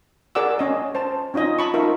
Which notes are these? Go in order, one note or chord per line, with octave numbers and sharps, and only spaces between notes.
G#4 A#4 D5 F#5 D6 E6
C#4 D#5
C5 A5
C#4 D#4 F4 D#5
A5 B5 C#6
D#4 F4 A#4 E5